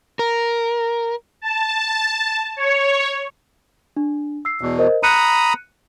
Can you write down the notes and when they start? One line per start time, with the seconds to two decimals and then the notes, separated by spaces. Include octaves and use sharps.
0.19 A#4
1.41 A5
2.56 C#5
3.97 D4
4.45 E6 C7
4.61 E2 B2
4.79 A#4 C5 D#5
5.03 A#5 B5 D#6 F#6 C#7 D#7